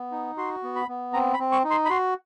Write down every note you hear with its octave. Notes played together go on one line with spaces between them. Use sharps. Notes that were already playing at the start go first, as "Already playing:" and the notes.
Already playing: B3
D#4
F#4 C6
B3
B5
B3
C4 A#5
B5
C4
C#6
D#4
C6
B5
F#4 C6